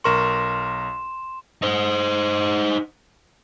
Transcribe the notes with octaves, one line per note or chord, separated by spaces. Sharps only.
B1 A#4 C6 C#6 E7
D#4 C5